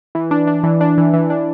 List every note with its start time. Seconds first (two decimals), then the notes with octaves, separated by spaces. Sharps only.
0.15 E3
0.31 D4
0.47 D4
0.63 E3
0.81 D4
0.98 E3
1.13 E3
1.30 D4